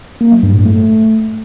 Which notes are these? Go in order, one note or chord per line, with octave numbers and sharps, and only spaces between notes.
A#3
F#3
G2
A2
A3